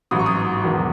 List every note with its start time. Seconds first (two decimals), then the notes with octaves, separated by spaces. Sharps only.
0.11 A1 G#2 F#3 D#6
0.19 C#6
0.26 D#6
0.62 E1 E2 D#3 F#3